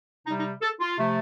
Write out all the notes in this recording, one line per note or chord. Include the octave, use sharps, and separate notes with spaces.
C3 G3 D#4
D#4
A4
F4
C3 F3 A3